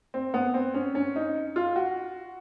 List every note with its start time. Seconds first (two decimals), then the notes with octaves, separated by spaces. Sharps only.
0.14 C4
0.34 B3
0.54 C4
0.74 C#4
0.95 C#4
1.16 D#4
1.56 F4
1.76 F#4